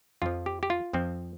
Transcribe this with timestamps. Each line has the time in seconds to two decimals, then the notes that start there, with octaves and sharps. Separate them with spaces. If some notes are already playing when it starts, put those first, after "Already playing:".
0.22 F2 F3 F4
0.46 G4
0.63 G4
0.70 F4
0.93 F2 F3 C4